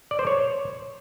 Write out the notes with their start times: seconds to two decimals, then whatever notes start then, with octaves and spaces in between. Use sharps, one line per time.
0.11 D5
0.19 C5
0.27 C#5